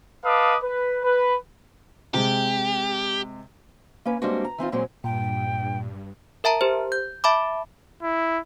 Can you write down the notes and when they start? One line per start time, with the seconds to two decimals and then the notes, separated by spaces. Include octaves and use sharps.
0.24 B4 D#5 F5 A5 D6 D#6
0.63 B4
1.04 B4
2.14 C3 G#3 G4
4.05 A#3 C#4 B4
4.22 G3 G#3 A#3 C4 D4 F#4
4.45 A#5
4.58 E3 C4 D#4 F4
4.72 A#2 F#3 G#3 C4
5.04 G2 A#2 G5
6.44 A#4 E5 A5 A#5
6.61 G4 C5
6.92 G6
7.24 E5 A5 B5 D6
8.02 E4